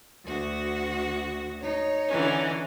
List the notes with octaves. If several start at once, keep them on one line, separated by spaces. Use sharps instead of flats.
D2 F#4
D#4 C#5
D3 E3 C#4